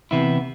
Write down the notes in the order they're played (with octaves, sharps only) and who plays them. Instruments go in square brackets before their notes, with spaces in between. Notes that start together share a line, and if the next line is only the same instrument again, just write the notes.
[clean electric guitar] C3 E3 B3 E4